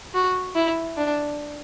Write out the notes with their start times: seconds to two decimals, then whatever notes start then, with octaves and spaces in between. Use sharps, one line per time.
0.14 F#4
0.56 E4
0.97 D4